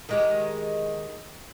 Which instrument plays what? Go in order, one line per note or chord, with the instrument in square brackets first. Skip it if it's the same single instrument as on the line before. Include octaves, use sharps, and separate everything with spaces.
[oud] D#3 G#3 G4